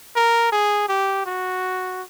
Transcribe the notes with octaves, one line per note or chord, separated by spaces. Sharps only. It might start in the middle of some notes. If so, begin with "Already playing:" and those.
A#4
G#4
G4
F#4